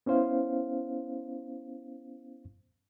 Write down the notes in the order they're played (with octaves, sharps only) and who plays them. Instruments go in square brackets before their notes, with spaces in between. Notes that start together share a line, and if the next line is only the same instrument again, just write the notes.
[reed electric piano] B3 C#4 E4 C5 F5